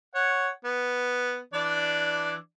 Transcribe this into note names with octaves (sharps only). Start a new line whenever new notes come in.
C#5 F#5
B3
E3 D4 D5